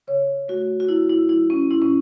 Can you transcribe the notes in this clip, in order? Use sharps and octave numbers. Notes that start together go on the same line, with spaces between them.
C#3 C#5
A3 F#4
F#4
F#2 E4
E4
F#3 E4
C#4
A2 E4
C#4